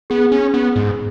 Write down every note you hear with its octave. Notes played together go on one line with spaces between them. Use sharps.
B3 G#4
C#4
B3
G#2